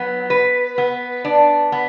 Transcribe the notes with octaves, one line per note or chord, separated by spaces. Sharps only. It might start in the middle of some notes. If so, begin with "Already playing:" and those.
Already playing: F#3 B3
B4
B3
D4
B3